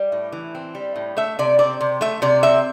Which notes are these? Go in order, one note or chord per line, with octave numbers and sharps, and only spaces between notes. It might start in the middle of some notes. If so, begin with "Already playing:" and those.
Already playing: G3
A2
E3
C4
G3
A2
A3 E5
C3 D5
C4 D5
C3
A3 E5
C3 D5
C4 E5